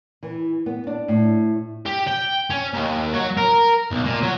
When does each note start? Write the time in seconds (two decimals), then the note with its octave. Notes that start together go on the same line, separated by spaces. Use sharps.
0.23 E3
0.66 B3
0.87 D4
1.08 A2
1.86 G4
2.07 G5
2.50 C#4
2.74 D#2
3.14 F#3
3.37 A#4
3.91 B1
4.05 A#2
4.23 F#3